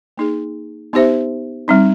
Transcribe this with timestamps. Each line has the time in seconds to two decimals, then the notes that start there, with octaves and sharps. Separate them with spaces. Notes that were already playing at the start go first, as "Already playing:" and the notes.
0.17 A#3 D#4 G#4
0.93 B3 D#4 G4 C5 E5
1.68 G3 C4 D#4